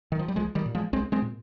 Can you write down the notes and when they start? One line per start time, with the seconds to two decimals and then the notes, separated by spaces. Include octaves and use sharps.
0.12 D#3
0.19 F3
0.28 G3
0.36 C2 F3 G#3
0.55 D#3 G3
0.66 A#2
0.75 F3 G#3
0.93 C2 G#3 C4
1.12 G#3 C4
1.22 A#2